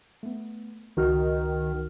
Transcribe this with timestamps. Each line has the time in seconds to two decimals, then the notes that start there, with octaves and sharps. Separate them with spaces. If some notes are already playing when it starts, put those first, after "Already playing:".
0.23 A3 B3
0.97 C#2 D#3 F#4 F6